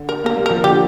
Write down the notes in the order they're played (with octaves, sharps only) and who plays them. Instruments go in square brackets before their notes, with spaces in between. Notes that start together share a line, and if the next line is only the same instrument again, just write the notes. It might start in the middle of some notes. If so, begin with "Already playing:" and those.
Already playing: [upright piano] D3
[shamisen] A#4
[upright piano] A#3 [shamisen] A#4
[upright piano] G3
[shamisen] A#4
[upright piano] F3
[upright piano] D3 [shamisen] G4